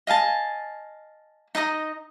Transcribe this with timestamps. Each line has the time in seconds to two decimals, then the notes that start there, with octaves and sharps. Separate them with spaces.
0.07 D#5 F5 G#5 A5
1.55 D#4 D#5 A#5 D#6